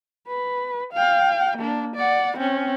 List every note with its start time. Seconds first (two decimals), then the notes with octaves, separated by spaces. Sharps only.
0.28 B4
0.93 F5 G5
1.58 A#3 D4
1.96 D5 F#5
2.38 C4 C#4